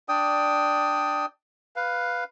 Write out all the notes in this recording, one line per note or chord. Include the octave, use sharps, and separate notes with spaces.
D4 D5 G5 D#6
B4 F5